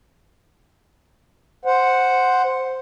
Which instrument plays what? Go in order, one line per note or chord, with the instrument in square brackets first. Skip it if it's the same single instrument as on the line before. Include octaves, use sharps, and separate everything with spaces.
[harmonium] C5 F#5